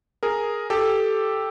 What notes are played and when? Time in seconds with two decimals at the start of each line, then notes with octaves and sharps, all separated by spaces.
0.23 G#4 A#4
0.70 G4 A4